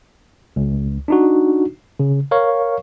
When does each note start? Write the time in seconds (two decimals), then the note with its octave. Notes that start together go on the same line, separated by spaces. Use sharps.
0.56 C#2
1.08 D4 D#4 F#4
2.00 C#3
2.31 A#4 C#5 F5 C#6